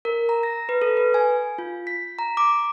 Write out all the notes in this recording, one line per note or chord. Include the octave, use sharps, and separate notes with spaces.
A#4
A#5
A#6
B4
A4
B4
G#5
F4
B6
A#5
D6